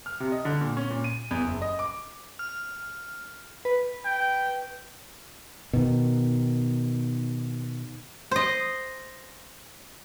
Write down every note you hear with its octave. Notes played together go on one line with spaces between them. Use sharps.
F6
C3
D#5
D3
A#2
C#4
A#2
D#7
E2
F#1
D#5
D6
F6
B4
G5
B2 D#3
C5 D#5